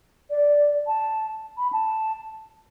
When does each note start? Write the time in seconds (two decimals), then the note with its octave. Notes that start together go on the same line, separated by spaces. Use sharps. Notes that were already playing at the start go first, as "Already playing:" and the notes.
0.31 D5
0.87 A5
1.58 B5
1.73 A5